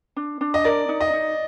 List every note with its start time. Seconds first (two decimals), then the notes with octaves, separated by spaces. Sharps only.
0.16 D4
0.41 D4
0.54 D#5
0.64 A#4 D5
0.89 D#4
1.00 D#5
1.13 D#4